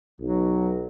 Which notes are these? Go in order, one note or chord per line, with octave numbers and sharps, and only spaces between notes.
B1 F#3